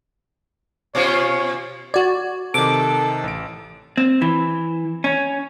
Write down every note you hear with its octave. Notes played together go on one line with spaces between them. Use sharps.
B2 C#4 F4 C#5
F#4 D5 G#6
C3 D#3 A4 D6
A1 D7
C4
E3
C#4